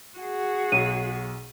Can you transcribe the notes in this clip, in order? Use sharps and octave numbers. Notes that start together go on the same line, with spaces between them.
F#4 G#4
B1 D#7